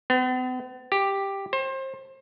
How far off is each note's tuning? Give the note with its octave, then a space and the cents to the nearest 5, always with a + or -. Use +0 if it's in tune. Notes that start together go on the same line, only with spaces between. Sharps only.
B3 +45
G4 +5
C5 +30